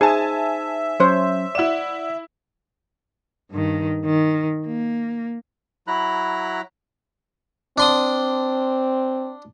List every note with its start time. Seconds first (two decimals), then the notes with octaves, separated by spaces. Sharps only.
0.01 D#4 G#4 C5 E5 G#5 A5
1.00 F#3 C#4 C5 C#5
1.55 E4 D5 F#5 E7
3.51 G2 D#3
4.05 D#3
4.66 A#3
5.87 F#3 E4 A#5 B5 F#6
7.78 C4 D4 C6 D#6